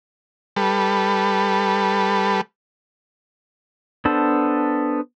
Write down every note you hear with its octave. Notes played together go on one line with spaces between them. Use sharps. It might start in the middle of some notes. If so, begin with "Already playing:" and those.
G3 A4 B4
B3 D4 A4 C5